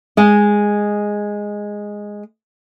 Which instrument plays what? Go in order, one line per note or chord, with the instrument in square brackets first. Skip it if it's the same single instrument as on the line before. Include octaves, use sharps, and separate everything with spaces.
[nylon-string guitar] G#3 D#5